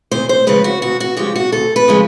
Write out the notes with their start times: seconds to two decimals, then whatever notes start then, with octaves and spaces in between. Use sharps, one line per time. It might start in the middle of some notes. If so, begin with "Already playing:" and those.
0.11 D2 C5
0.29 C5
0.47 C#3 F3 G#3 B4
0.64 F#4
0.82 D2 F#4
1.00 F#4
1.17 C#3 F3 G#3 G4
1.36 F#4
1.52 D2 A4
1.76 B4
1.88 C#3 F3 G#3